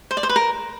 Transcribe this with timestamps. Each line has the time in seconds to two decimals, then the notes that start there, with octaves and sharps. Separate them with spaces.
0.11 C5
0.17 D5
0.23 C5
0.29 B4
0.36 A#4